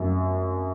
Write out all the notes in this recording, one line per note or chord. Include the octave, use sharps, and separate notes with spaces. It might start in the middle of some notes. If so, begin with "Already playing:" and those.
Already playing: F#2